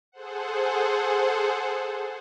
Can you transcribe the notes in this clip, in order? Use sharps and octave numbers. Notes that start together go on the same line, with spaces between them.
G#4 A4 C5 F#5